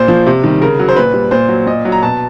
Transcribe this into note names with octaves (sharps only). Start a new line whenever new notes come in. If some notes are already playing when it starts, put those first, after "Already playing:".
Already playing: A#2 C5
F3
C3
D#3 G3
C#3 A#4
F#3
C5
A#2 B4
G3
A#2 C5
F#3
A#2 D#5
F#3
A#5
B2 A5